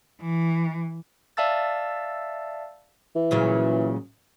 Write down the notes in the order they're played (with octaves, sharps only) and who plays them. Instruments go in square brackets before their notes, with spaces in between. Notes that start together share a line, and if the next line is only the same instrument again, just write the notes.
[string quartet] E3
[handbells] D5 E5 F5 A5 E6 A6
[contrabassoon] E3
[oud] A#2 C#3 F#3